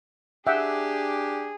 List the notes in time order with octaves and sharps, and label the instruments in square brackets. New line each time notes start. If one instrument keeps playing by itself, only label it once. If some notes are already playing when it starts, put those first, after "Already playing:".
[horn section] D4 G4 [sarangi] G#4 [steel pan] E5 F#5 G5